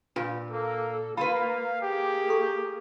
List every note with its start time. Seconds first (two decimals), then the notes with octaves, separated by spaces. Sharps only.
0.16 A#2 D4 F4 B4
0.51 A#3 A4
1.17 A#3 F4 B4 F5 B5
1.82 A#3 G4 G#4
2.29 A4 C#6